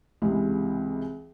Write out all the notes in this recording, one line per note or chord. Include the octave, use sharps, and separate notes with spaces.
C#2 C3 E3 G#3